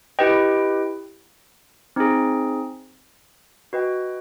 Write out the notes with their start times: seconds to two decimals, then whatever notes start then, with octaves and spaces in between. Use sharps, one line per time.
0.19 E4 G4 B4 D#5 G5
1.96 C4 D#4 G#4
3.73 F#4 B4 D#5 G5